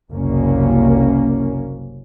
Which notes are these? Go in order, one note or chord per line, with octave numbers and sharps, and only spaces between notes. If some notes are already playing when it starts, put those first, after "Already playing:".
F#1 C2 F#2 A#3 C#4